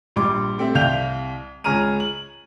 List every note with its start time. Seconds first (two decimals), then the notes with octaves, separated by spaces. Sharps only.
0.16 A#1 G3 C6 D6
0.58 A3 C4 G4 E5
0.75 C2 C3 F5 G5 G6 F7
1.64 C#2 G#4 C#5 A#5 F6 D#7
2.00 F#7